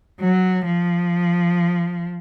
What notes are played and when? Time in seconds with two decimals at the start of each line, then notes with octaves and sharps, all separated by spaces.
0.20 F#3
0.65 F3